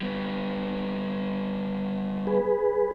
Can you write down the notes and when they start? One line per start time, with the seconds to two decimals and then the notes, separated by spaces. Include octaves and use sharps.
0.01 G3 B3
2.27 G#4 B4